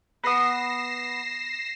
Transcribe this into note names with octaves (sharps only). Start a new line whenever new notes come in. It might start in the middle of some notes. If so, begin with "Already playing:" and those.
B3 D#6 A#6 C7 E7